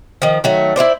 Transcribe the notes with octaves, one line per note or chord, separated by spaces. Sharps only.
D#3 F3
D#3 F#3 A3
E4 F4 C5 D5